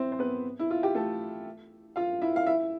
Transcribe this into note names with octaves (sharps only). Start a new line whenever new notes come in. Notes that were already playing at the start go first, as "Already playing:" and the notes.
Already playing: C4 E4 C5 E5
C5
B3 B4
E4
F4
G4
A3 A4
F4 F5
E4 E5
F5
E4 E5